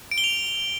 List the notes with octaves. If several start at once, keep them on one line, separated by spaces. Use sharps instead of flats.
D7
G7
F7